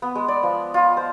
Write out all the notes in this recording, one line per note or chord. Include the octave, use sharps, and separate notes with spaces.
B3
G#3
D5
F3
F4
C5